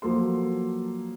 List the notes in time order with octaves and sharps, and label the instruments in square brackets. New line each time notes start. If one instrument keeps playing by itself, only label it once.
[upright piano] F3 F#3 A#3 A4 C6